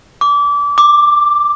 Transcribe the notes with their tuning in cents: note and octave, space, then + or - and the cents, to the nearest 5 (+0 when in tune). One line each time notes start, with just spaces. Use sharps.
D6 -25
D6 +5